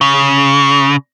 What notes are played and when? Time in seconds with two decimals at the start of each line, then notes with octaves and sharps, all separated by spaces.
0.01 C#3